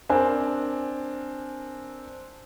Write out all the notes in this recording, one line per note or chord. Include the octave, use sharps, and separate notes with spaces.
C4 D4 A#4 G#5